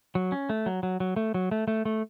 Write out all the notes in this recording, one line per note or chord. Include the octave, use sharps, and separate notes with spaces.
F#3
C#4
A3
F#3
F#3
F#3
A3
F#3
A3
A3
A3